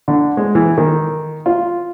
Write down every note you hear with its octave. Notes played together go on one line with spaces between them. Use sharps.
D3
G#3
E3
D#3
F4